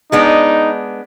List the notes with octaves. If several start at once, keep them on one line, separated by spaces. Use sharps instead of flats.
G#3 B3 D4 D#4